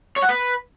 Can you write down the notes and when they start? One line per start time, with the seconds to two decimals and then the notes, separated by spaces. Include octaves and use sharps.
0.16 C#5
0.23 F#5
0.29 B4